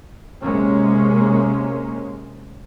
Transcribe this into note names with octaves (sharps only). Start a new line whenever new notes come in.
C3 G#3 A#3 C#4